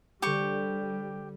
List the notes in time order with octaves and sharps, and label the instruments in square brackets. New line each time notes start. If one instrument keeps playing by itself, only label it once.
[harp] D3 C5 [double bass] G3 [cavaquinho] G4 C#6